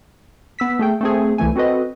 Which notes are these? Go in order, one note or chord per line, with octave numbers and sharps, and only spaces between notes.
B3 E6 B6
A3 G#4 G5
A3 C4 G#4
C2 E3 A3 G#5
C4 F#4 A4 B4 D#5